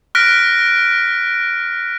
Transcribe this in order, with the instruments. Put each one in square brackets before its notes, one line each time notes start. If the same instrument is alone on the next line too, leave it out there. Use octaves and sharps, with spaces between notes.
[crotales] F6 F#6 A#6 B6 D7